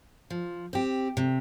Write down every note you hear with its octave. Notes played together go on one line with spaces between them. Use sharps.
F3
C4 G4
C3